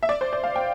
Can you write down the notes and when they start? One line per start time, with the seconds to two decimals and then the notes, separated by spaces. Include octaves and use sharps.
0.03 E5
0.09 D5
0.21 C5
0.33 D5
0.43 F5
0.56 G5